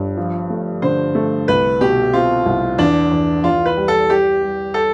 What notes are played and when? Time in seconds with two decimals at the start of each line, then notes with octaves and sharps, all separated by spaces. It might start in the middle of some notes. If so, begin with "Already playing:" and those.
Already playing: G1 G2
0.17 F3
0.50 A3
0.82 D3 C5
1.15 A3
1.48 C2 B4
1.81 B2 G4
2.13 C4 F4
2.46 C2
2.78 E2 D4
3.11 E2
3.44 E2 F4
3.66 B4
3.77 G3
3.88 A4
4.09 G3 G4
4.42 G3
4.74 A4